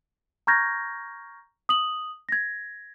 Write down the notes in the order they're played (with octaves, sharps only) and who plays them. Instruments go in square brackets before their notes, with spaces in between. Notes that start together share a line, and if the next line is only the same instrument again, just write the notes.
[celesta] A#5 C#6 F6 G6 G#6 A#6
D#6 F#7
G#6 A#6